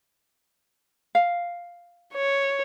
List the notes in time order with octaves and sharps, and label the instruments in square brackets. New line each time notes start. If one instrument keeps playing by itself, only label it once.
[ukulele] F5
[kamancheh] C#5